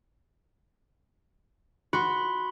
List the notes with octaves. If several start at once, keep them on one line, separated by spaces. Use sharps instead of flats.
F#4 B5 C6